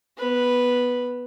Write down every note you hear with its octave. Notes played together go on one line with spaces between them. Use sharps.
B3 B4